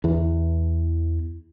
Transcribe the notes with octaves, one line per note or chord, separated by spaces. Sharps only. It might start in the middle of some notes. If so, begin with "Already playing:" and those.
E2 E3